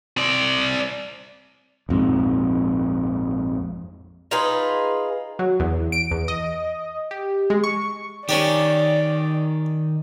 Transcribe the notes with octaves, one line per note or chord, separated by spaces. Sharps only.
C4 D5
A#1 F2 G#2
D#4 F4 G#4 B4
F#3
E2
D7
E2
D#5
G4
G#3
C#6
D#3 C#4 D4 G4 D5